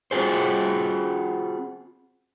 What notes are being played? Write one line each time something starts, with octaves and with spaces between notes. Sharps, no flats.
C4 F4 F#4 G#4 C5